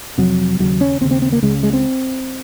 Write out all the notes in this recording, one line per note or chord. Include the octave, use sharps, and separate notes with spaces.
F2 C3 F#3
D#2 C#3 F#3
C#4
D#2 C#3 C4
C4
C4
A#3
C#2 C#3 G#3
G#3
C4